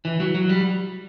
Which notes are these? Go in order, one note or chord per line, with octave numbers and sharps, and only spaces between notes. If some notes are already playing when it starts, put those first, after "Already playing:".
E3
F#3
F#3
G3